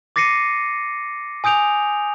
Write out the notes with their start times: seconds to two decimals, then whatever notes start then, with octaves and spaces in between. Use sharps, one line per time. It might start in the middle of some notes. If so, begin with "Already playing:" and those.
0.16 D6 A6 A#6 C7 C#7 D#7
1.44 G#5 D#6 G6 D7 F7